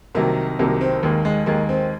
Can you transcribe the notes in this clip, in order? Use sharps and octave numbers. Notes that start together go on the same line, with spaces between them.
C2 C3 D#3 F#3 A#3
C2 C3 D#3 F#3 A#3
C4
D#2 D#3 G#3 A#3
G#3
D#2 D#3 G#3 A#3
C4